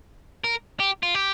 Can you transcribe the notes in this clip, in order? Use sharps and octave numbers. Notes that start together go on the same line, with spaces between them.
A#4
G4
F4
G4